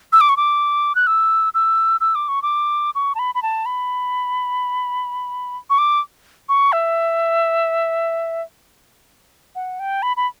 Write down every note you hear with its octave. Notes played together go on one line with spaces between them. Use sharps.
E6
D6
C#6
D6
F#6
E6
E6
E6
D6
C#6
D6
C#6
A5
B5
B5
A5
B5
C#6
D6
C#6
E5
F#5
G5
B5
B5